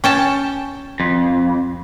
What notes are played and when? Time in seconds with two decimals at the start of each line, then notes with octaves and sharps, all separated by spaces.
0.04 C#4 G5 A5
1.00 F2